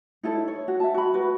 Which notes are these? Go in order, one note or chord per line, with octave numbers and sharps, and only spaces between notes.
D#4 E4 A4 C#5
C#5
F#4
E5 A5
F#4 B5
F#4 B4